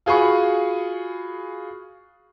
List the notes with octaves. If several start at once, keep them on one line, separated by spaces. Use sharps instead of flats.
F4 F#4 G#4 G#5 B5 C#6